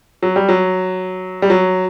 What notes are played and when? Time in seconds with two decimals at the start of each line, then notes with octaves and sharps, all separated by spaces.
0.22 F#3
0.36 G3
0.49 F#3
1.42 G3
1.50 F#3